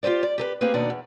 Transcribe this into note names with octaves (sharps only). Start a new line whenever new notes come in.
F4 G4 G#4 C5 D5
D5
G4 A4 B4
A#3 C4 G4 G#4 B4
D#2 B2 D4 D#4 D5 F#5
E2